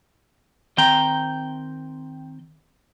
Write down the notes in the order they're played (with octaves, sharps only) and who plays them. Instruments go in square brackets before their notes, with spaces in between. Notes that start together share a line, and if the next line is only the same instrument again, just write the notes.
[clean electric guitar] D#3 C4 G5 A#5